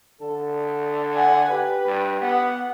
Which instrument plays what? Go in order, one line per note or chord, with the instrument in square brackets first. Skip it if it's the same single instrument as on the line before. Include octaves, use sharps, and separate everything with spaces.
[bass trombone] D3 [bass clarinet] A4
[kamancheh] F#5 G#5
[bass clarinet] G4 [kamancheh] B4
[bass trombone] G2
[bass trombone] B3 [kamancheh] F#5